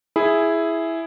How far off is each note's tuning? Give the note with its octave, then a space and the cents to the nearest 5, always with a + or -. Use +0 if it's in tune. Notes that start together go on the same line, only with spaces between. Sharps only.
E4 +0 G#4 +0